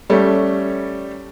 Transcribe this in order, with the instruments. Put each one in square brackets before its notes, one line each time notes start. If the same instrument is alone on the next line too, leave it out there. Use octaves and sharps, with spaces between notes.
[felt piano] G3 A3 C#4